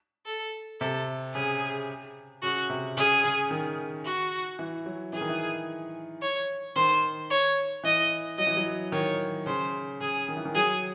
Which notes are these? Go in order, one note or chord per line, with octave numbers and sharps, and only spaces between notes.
A4
C3 A4
C#3 G#4
C#3 F#4
C3
C#3 G#4
C#3
D#3
F#4
E3
F#3
E3 G#4
D#3
E3
C#5
D#3 C5
C#5
E3 D#5
F#3 D#5
E3
F#3
D#3 C#5
C#3 C5
C#3 G#4
D#3
E3
D#3
F#3 G#4